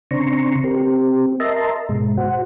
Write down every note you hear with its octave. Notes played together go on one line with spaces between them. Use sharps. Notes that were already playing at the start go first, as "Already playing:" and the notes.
C#3 C4 D4 A#5 C6 C#6
C4 G4 A#4
C4 G4
A#4 D#5 E5 A5 A#5 C6
G#2 B2 G#3
F#4 C5 F#5